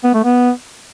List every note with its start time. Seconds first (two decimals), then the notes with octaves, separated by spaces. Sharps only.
0.04 B3
0.14 A3
0.24 B3